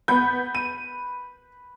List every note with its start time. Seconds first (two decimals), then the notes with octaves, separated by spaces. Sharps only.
0.08 B3 B4 G6
0.55 D#7